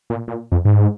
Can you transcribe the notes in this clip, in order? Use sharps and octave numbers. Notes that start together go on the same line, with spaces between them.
A#2
A#2
F2
G#2